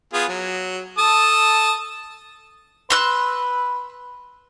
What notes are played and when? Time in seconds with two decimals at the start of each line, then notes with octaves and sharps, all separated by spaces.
0.13 B3 F4 G#4
0.28 F#3
0.98 A4 A5 D#6
2.90 B4 C6 E6 F#6